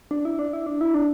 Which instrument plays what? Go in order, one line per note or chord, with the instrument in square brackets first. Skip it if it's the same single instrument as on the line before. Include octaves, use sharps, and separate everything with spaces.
[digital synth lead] D4
E4
D4
E4
D4
E4
D4